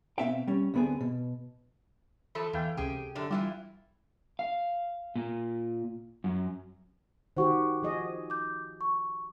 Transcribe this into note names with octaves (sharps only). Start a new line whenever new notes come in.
B2 E3 C4 E5 F5 G5
G3 C#4
D2 D3 B3 C4 G#4
B2
E3 F3 A4 B5
E2 E3 F5 G5
C#2 C3 G4 G#4 G5
F#2 D3 D4
E3 G3 E4 F4
F5
A#2
F#2
D#3 F#4 G4 C5 F#5 C#6
F3 G#4 D#5
D6 G6
C#6